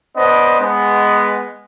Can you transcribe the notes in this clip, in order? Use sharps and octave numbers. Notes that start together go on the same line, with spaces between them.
B3 D4 C5 D#5
G#3 B3